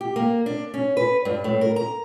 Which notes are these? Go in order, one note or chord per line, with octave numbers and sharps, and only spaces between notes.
G4
A#3
D4
C#4
B4
G2
A2
A#4
A#5